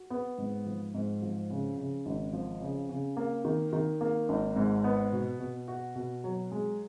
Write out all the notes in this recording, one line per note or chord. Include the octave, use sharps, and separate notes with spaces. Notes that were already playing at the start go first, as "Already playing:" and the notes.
Already playing: F#4
B3
G#2
F3
G#2
F3
C#3
C#3
G#1
F3
C#3
C#3
A#3
D#3
D#3
A#3
G#1
G#2
B3
B2
B2
F#4
B2
F#3
G#3